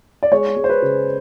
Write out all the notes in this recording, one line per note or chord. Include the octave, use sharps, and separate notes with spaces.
D5
G#3 C#5
G#3
C5
B4
C#3